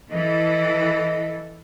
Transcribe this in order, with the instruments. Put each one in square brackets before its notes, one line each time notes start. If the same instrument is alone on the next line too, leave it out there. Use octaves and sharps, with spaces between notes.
[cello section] E3 A4 [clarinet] D#5